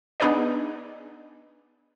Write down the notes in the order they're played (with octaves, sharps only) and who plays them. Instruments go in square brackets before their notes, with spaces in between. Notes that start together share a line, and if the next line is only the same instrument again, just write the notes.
[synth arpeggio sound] B3 D4 D#4 G#4 B4 D5